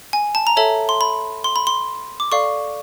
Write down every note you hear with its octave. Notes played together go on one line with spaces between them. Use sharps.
G#5
A5
A#5
A4 C#5 E5 A5
C6
B5
C6
B5
C6
D6
A4 D5 F5 C#6